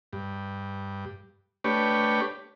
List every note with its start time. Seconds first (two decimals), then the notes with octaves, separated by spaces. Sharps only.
0.13 G2
1.64 A3 D4 G4 B4 C#5